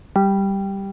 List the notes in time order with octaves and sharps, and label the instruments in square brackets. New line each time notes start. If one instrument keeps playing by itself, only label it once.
[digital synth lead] G3